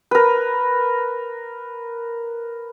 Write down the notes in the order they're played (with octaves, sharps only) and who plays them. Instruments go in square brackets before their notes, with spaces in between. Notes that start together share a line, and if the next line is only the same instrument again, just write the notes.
[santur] A#4 B4